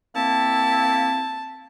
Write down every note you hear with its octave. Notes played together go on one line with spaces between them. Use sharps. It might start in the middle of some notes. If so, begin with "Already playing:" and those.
A#3 C4 E4 A5